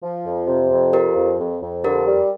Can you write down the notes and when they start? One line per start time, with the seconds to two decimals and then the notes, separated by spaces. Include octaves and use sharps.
0.02 F3
0.24 F2
0.47 C3
0.70 F2
0.93 F3 G4 A#4
1.16 F2
1.39 F2
1.62 F2
1.84 D3 G4 A#4
2.07 G3